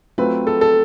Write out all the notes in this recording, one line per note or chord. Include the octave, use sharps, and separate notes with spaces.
F#3 A3 C4 F4 B4
A4
A4